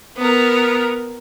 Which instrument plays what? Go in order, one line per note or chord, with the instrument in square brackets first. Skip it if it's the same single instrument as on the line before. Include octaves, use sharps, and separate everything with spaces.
[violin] B3 A#4